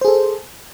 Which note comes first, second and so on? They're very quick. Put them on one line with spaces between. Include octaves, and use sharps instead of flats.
C5 G#4 A4